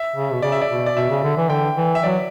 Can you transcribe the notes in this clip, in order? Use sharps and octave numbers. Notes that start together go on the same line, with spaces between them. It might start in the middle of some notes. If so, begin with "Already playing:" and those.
Already playing: E5
C#3
B2
C#3 D5
E5
D5
B2
D5
B2 E5
C#3
D3
E3
D3 G5
E3
E5
F#3 D5